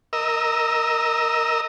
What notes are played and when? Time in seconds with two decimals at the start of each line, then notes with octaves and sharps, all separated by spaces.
0.13 A#4 D#5 E6